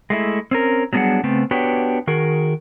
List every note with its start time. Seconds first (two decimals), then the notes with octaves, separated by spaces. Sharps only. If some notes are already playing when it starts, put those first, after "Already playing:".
0.10 G#3 A3 E4
0.51 C4 C#4 A#4
0.93 F#3 G3 B3 D4 G#4 F#5
1.23 C#3 A3 B3 C4
1.51 B3 D4 F#4 G4 B4 C#5
2.07 D#3 F#4 G#4 A#4